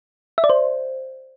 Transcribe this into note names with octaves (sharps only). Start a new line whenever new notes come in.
E5
D5
C5